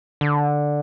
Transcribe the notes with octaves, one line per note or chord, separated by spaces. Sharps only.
D3